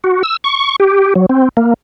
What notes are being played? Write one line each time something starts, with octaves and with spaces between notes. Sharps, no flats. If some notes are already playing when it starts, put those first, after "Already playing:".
F#4
E6
C#6
G4
F#3
C4
A#3